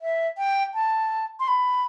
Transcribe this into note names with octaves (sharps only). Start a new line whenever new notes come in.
E5
G5
A5
C6
B5